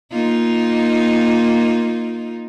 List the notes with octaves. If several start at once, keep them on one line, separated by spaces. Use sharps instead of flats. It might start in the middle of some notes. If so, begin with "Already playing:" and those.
A#3 D#4 F4